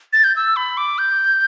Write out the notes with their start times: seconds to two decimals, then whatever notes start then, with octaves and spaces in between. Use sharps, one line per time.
0.13 A6
0.24 G6
0.36 E6
0.56 B5
0.77 D6
0.98 G6